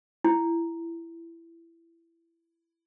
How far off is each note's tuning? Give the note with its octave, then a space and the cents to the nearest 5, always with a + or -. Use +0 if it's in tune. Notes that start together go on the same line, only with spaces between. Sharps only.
E4 +20